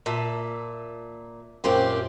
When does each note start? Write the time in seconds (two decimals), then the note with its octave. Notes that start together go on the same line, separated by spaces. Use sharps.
0.06 A#2 E5 A5
1.64 F#2 A#2 C4 F4 G4 C6